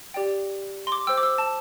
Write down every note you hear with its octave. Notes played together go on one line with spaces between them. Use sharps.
G4 D5 G5
C6
D6
C5 G5 E6
D6
E6
A5